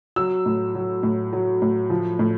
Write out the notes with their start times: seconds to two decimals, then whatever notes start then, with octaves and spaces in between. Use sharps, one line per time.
0.16 F#3 E6
0.46 A2
0.75 F#3
1.03 A2
1.33 F#3
1.62 A2
1.90 F3
2.19 A2